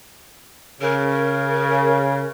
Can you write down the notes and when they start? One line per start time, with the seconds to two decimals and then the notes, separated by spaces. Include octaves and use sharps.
0.82 C#3 A#4